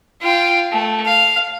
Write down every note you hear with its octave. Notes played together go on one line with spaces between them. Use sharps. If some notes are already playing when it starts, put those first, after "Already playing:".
F4 G5
A3
F5